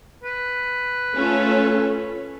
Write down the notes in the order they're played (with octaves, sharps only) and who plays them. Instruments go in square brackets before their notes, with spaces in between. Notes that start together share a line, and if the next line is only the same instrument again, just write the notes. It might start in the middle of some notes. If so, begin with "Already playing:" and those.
[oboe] B4
[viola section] A3 C#4 F4 A4 C#5